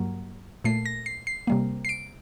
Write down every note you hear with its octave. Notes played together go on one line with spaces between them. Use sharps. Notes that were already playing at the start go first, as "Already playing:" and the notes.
Already playing: G2 F#3 A#3
A#2 A3 C7
A#6
C7
C7
C3 G3 A#3
C7
D7